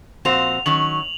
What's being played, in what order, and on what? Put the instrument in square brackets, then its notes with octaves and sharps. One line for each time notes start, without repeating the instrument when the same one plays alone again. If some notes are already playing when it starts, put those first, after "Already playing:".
[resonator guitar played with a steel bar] A#2 F3 C4 F#4 C5 [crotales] F7
[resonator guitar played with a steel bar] D#3 F#3 C#4 [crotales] F#7